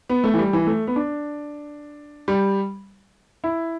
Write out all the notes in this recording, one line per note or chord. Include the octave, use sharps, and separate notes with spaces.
B3
A3
E3
G3
E3
A3
B3
D4
G3
E4